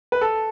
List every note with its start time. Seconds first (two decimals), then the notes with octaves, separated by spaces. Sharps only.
0.12 B4
0.21 A4